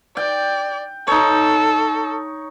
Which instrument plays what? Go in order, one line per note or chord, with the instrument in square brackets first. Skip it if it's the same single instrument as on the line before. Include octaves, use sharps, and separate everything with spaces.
[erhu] D5 [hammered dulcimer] G5
[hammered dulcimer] D#4 C#5 [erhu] A4